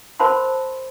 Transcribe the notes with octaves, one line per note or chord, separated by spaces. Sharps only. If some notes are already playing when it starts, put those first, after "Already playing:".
A#4 C5 A5 B5 C6